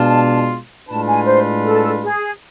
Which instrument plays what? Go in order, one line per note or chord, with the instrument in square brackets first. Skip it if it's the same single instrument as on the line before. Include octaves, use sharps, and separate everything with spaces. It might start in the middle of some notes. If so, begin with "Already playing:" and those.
Already playing: [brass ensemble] B2 G#3 D4 F4 [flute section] A5
[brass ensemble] A2 G#3 D4 F4 B4 [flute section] A5
[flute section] G#5
C5
A4
G#4